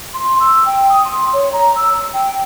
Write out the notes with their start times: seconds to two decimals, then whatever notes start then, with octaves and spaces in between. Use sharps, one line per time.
0.14 C6
0.40 E6
0.66 G5
0.90 D#6
1.05 C6
1.33 C#5
1.53 A#5
1.76 E6
2.13 G5